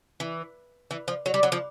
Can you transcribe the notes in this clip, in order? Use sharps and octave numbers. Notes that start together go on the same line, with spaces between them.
E3
E3
F3
F#3
G3
F#3
F3